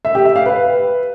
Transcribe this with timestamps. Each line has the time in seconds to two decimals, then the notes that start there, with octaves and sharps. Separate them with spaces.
0.05 E5
0.15 G4
0.25 E5
0.36 F5
0.46 B4